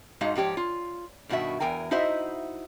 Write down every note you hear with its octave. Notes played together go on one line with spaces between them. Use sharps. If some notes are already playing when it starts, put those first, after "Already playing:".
G#2 G#3 D#4 F#4 F5
G#2 F3 G4 C#5 D5
F4
G2 B2 D#3 F#4 E5
E2 A#4 G5 G#5
D#4 E4 F#4 C5 D#5 E5